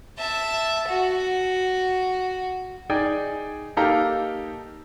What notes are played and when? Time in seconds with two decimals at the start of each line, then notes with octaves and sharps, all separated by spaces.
0.18 E5 A5
0.88 F#4
2.90 D#4 G#4 D5 G5 G#5
3.77 A#3 D#4 G4 A4 F5 A#5